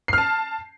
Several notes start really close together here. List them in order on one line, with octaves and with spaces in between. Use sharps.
C7 F6 A5